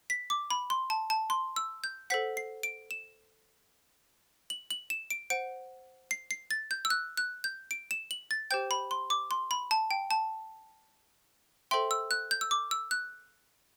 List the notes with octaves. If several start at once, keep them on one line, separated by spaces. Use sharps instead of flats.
B6
D6
B5
C6
A5
A5
C6
E6
G6
A4 C5 F#5 B6
C7
D7
E7
F#7
F#7
E7
D7
C5 F#5 D7
C7
C7
A6
G6
E6
F#6
F#6
G6
D7
E7
F#7
A6
G4 C5 G5 G6
B5
C6
D6
C6
B5
A5
G5
A5
A4 C5 E5 G5 C6
E6
F#6
G6
E6
D6
E6
F#6